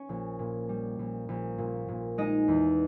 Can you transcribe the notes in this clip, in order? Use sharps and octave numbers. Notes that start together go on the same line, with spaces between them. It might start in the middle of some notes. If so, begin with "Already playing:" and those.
Already playing: C#4 C#5
A#1
A#2
G3
A#1
A#1
A#2
A#2
G#3 D#4 D#5
E2